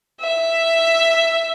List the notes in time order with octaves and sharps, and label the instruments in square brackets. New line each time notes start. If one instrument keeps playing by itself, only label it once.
[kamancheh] E5